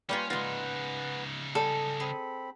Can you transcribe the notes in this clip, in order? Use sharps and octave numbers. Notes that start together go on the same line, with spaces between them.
G3 A#3 C#4 F4 B4 G5
C#3 G#3 D#4 F4 B4 F#5
G3 A4 G#5
C4 G#4 B5